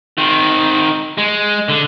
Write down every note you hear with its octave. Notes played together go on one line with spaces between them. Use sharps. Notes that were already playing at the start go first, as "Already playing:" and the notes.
D#3 C4
G#3
D3